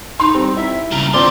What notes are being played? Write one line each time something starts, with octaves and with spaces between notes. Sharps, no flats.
D#4 C6
G3 C4
E4 E5
G2 C#3 A#5
C4 D4 F4 C5 D5 C6